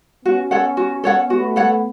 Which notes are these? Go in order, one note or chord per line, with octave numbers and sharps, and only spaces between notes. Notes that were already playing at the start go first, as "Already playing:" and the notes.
B3 C#4 F#4
A4 C#5 F#5
F#4
A4 C#5 F#5
A3 B3 F#4
A4 C#5 F#5